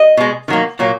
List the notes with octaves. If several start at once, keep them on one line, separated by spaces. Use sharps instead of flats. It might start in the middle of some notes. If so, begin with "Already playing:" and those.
Already playing: D#5
B2 G#3
D#3 F#3 A#3
A#2 F#3 A#3